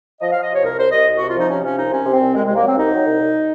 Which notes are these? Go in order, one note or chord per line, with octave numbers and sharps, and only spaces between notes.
F3 D#5
F3 F5
D#5
C3 C#5
C2 A#4
C2 C5
C2 D#5
C2
C3 F#4
F4
F3 D#4
C3 C#4
F3 C#4
C2 D#4
C3 C#4
C3
C4
C2
C2 G#3
C2 G#3
A#3
F#3 C4
C2 D#4
F#3
C2
C2